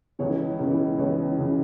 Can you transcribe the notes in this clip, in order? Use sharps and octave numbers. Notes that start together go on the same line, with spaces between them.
C#2 C#3 E3 C#5
C#2 C#3 E3
C#2 C#3 E3 C#5
C#2 C#3 E3